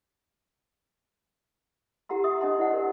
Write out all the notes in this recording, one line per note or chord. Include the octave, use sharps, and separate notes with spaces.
E4 G4 F#5 A#5 C6
E5 C6 D#6
C#4 D4 D#5 F#5 A5 C6
E4 C5 D5 D#5 F#5 A#5
G4 A#4